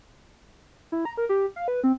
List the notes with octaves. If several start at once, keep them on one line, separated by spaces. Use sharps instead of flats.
E4
A#5
A#4
G4
F5
B4
C4